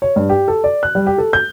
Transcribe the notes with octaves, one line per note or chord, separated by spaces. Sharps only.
C#5
G2
G4
A4
D5
F#6
G3
G4
A4
G6